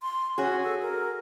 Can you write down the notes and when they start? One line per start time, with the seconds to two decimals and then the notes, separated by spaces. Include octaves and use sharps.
0.02 C6
0.38 C#4 F#4 G#4
0.63 A4
0.82 A#4